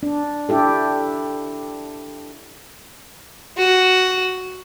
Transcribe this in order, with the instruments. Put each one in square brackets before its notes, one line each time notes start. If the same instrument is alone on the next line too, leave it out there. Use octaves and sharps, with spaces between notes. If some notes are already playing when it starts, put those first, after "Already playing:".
[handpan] D4
D4 E4 G4 A4
[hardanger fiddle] F#4